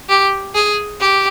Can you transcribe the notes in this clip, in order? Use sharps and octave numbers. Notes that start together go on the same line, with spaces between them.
G4
G#4
G4